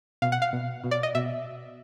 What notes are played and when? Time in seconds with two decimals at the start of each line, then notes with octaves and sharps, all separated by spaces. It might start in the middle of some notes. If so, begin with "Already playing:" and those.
0.22 B2 F5
0.32 F#5
0.42 F5
0.53 B2
0.84 B2
0.91 D5
1.03 D#5
1.15 B2 E5